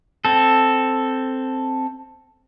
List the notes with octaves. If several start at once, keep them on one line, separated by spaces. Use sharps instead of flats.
C4 A4